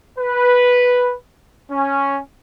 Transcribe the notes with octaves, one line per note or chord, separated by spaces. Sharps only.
B4
C#4